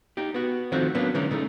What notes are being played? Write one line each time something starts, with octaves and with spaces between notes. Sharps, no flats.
D#4 G4
B3 F#4
D#3 F3 A3 C4 F#4
F#3 A#3 B3 C#4 D4
D3 E3 G3 G#3 C#4 D#4
C#3 A3 D#4